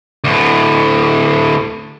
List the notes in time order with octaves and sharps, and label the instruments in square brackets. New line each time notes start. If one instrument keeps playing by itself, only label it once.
[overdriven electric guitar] D2 A2